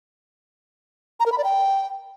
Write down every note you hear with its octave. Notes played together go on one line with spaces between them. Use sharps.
A#5
A#4
B5
D5
G5